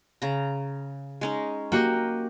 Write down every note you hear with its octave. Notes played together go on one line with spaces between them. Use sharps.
C#3 A#5
G#3 C#4 D#4
A#3 F#4 G4 A#4 D#5 G5